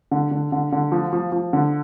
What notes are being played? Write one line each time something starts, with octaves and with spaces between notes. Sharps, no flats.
D3
D3
D3
D3
F3
F3
F3
D3